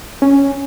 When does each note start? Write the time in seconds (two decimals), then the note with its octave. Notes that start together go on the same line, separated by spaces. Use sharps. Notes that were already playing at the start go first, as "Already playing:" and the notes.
0.22 C#4